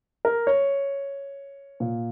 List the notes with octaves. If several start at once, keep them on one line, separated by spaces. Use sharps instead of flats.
A#4
C#5
A#2